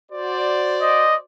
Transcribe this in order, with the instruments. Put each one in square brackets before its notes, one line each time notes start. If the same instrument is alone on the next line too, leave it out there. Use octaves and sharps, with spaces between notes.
[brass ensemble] F#4 C5 D5
[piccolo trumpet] D#5